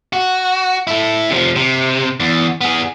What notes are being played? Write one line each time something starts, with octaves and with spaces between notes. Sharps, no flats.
F#4
A3 E4
C3 F3
C3
E2
B3 G#4